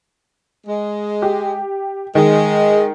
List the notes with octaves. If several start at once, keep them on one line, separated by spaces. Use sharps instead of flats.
G#3
G4
D#3 G#3